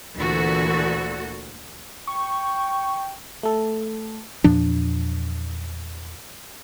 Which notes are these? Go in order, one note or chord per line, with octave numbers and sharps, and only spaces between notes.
D2 A#2 E3 F#4 A4
G5 C#6
A3 A4
E2 A#2 F3 D4